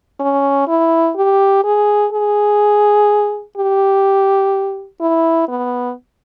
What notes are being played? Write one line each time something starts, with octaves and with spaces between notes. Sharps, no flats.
C#4
E4
G4
G#4
G#4
G4
E4
B3